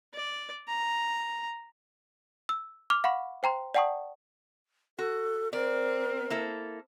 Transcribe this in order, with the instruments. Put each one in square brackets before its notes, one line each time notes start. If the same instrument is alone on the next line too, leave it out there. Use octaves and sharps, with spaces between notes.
[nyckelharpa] D5
A#5
[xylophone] E6
D6 F6 F7
F5 F#5 B5 C#6
C5 G5 A#5 C6
D5 F#5 G5 A5 C#6 D#6
[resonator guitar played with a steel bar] F#4 [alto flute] A4
[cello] C4 [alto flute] A#4 [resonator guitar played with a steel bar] D5
[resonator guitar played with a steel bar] A#3 E4 A4